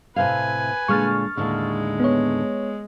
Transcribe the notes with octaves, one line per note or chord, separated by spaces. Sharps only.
A2 C3 B4 F5 G#5
A#2 D3 G#3 C#6 F6 A6
D#2 A2 D3 G#3
B3 C#5